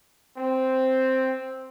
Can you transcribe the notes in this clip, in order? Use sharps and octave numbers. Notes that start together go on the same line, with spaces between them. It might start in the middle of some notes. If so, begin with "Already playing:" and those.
C4